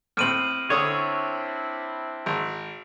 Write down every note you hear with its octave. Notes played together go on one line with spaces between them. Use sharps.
A2 C4 F6 D#7 F#7
D3 C4 D4 E4 C#5 D#6
G#1